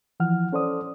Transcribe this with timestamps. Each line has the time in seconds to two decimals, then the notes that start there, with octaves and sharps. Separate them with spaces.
0.20 E3 F3 F#5 F6
0.53 C#4 A4 C5 D5 D#6